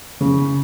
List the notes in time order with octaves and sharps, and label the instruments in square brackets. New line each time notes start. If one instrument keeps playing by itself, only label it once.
[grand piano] C#3